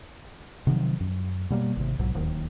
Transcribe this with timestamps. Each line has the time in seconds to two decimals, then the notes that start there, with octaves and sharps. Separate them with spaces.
0.67 C3 D#3 F3 F#3
1.00 F#2
1.50 B2 G3 A#3
1.76 G#1 C3
1.99 B1 G#2 B2 F#3
2.15 D1 D#2 D#3